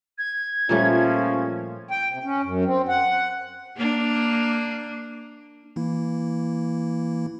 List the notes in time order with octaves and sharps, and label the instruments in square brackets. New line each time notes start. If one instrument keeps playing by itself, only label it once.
[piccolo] G#6
[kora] A#2 G3 A3 [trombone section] F3 C#4
[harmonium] G5
C3
C#4
F#2
C4
F#5
[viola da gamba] A#3 D4
[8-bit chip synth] E3 A#3 E4